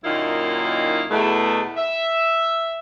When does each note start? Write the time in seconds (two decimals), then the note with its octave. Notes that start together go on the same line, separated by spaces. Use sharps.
0.05 F#2 A#2 D#3 A#3 D#4 E4
1.11 E2 B2 A3
1.77 E5